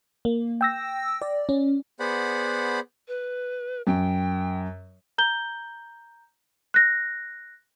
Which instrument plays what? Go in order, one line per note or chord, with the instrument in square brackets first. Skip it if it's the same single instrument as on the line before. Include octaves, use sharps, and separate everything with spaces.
[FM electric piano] A#3
G5 E6 A#6
D5
C#4
[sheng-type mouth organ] B3 G#4 C5 D5 F#5 B5
[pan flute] B4
[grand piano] F#2 [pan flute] G5
[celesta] A#5 G6 G7
F#6 A#6